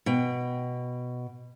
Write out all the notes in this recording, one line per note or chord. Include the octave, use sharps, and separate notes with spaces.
B2 G5